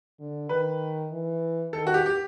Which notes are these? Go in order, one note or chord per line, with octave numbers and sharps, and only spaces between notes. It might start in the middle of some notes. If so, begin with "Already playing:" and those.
D3
D#3 B4
E3
D#3 A4
F#4
G4
G4